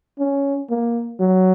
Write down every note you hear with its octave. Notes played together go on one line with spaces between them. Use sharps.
C#4
A#3
F#3